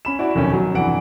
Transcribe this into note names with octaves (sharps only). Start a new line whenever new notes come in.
C#4 B5 E7
E4 F#4 D5
F1 B1 D#3 C#4
F#3
F1 G2 E3 F#5 D7